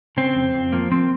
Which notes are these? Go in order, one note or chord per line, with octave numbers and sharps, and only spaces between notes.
C#3 C4
F2
F2
F3 A#3
F3 C4